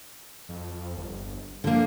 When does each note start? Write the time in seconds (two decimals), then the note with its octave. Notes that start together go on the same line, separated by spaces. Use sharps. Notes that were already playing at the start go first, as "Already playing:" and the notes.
0.49 F2
0.97 G1
1.64 D3 F3 A#3